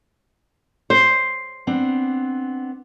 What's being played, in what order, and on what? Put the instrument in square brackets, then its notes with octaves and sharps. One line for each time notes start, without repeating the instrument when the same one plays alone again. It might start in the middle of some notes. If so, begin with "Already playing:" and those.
[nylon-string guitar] C5
[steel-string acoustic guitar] B3 C4 D4